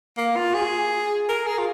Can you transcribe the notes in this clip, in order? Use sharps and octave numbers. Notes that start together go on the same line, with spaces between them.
A#3
F4
G#4
A#4
G#4
F4